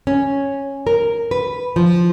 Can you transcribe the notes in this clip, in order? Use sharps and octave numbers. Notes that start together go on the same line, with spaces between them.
C#4
A#4
B4
F3